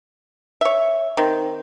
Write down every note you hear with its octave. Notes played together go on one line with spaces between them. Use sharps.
C#5 E5
D#3 C4